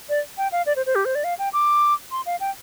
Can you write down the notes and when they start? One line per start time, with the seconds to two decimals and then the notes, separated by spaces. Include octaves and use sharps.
0.09 D5
0.38 G5
0.52 F5
0.66 D5
0.76 C5
0.86 C5
0.95 G4
1.05 C5
1.15 D5
1.24 F5
1.39 G5
1.53 D6
2.11 C6
2.26 F5
2.40 G5